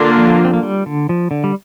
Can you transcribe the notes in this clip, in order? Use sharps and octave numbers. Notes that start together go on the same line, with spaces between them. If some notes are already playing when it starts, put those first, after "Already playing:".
Already playing: D3 A#3 D4 F4
F3
C4
A#3
G3
D3
F3
D3
G3